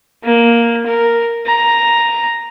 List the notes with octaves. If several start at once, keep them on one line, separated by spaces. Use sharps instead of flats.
A#3
A#4
A#5